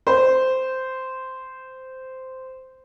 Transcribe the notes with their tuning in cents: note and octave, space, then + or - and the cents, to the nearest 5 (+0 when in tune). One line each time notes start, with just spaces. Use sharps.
C5 -10